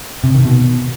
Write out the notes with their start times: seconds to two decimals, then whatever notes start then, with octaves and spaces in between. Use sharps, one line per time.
0.24 C3
0.34 D#3
0.45 B2